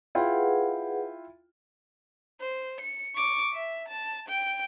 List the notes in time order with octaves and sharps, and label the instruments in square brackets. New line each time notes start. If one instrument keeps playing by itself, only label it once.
[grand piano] E4 F4 G5 [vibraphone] G#4 B4 F#5
[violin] C5
C#7
C#6 D6
E5
A5
G5